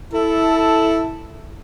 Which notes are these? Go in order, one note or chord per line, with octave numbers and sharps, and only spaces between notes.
E4 A4